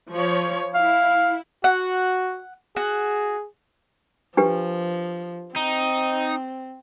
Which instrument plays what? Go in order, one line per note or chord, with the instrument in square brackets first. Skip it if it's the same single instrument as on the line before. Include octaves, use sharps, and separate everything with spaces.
[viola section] F3 C#5
[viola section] E4 [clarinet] F5
[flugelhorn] F#4 [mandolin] F#5
[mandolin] F#4 [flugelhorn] G#4
[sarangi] F3 [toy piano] D4 G4 B4
[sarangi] C4 [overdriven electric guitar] D#4